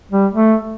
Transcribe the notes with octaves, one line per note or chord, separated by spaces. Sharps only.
G3
A3